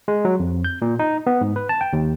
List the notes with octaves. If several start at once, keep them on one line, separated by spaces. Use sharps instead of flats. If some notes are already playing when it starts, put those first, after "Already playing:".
G#3
F#3
F2
G6
A#2
D#4
B3
G#2
B4
A5
G5
D#2